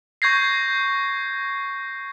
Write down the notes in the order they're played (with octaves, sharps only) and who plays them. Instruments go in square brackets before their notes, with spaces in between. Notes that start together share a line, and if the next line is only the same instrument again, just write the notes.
[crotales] C#6 G6 G#6 A#6 C7